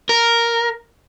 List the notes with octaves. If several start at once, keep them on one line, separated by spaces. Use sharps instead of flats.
A#4